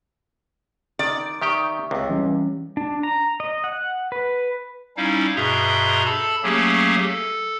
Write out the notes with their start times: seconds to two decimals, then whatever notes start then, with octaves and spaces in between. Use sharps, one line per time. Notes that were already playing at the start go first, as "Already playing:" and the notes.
0.99 D#3 D5
1.42 D#3 G4 E5 G5 C#6 D#6
1.91 C#2 C3
2.10 E3 G3 C#4
2.77 D4
3.03 A#5
3.40 D#5
3.64 F#5
4.12 B4
4.97 G3 C#4 D#4 E4 F5
5.36 G2 B2 G#4 E5 A#5 C6
6.05 A4 A5 B5
6.43 F#3 A3 A#3 C#4 G4 G#4
7.00 A4